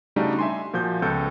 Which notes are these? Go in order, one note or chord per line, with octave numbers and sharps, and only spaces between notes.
C#3 G3 A3 D4 D#4 F#4
E5 G#5 C6
A#2 F3 F#4 G6
C#2 B3 A4 G6